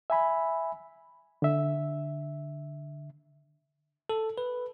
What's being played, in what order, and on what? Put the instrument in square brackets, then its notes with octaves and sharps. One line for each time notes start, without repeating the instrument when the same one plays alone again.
[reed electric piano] E5 G#5 B5
D3 E5
[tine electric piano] A4
B4